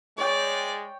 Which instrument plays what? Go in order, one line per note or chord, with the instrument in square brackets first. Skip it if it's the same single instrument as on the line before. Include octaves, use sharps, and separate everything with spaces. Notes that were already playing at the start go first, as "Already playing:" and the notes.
[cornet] G#3 [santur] C#5 G5 [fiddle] D5